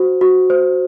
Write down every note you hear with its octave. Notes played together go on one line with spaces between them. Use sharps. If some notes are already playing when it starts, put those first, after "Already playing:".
Already playing: F#4 C5
F#4
C5